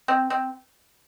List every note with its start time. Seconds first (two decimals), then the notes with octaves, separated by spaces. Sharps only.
0.08 C4
0.30 C4